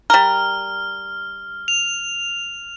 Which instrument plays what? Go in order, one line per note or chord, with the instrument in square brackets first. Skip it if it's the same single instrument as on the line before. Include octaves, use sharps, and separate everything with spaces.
[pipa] G3 A#4 [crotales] F6
[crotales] F7